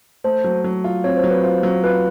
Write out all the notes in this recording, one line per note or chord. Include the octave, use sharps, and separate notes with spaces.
A3 C5
F#3
F#3
F4
C4 C#5
C5
F#3
B4
F4 C5
F#3
F4 B4